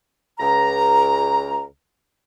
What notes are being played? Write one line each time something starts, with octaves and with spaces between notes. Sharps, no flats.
C#2 A#5